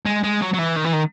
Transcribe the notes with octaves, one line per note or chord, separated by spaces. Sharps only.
G#3
G#3
F#3
F#3
E3
D#3
E3
D#3